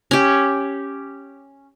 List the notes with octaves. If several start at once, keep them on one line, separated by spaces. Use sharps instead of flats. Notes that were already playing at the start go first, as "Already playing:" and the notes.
C#4 G4